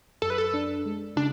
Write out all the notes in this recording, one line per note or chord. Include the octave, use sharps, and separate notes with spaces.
F#2 A4
B4
A4
D4
G#3
C#3 D4